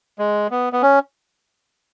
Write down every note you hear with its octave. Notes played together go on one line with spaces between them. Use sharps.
G#3
B3
B3
C#4